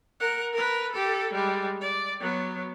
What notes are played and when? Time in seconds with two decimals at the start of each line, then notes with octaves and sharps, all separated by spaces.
0.20 A#4 F#5
0.53 A#4 B4
0.92 G4 A4
1.33 G3 G#3
1.81 D5
2.20 F#3 B3